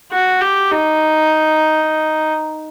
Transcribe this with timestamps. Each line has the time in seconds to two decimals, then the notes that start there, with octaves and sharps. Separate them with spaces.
0.12 F#4
0.41 G4
0.71 D#4